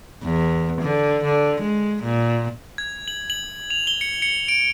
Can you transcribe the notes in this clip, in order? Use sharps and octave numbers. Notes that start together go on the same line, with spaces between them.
E2
D3
D3
G#3
A#2
G#6
F#7
F#7
F7
G7
C#7
C#7
D7